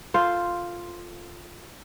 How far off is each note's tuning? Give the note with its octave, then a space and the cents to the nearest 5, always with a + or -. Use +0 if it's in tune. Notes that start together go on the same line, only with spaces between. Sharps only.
F4 +0 A4 +15 C5 +0